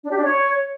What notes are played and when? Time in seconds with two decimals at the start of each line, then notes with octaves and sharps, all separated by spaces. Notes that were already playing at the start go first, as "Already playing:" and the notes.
0.03 D4
0.10 G4
0.16 D4
0.22 C#5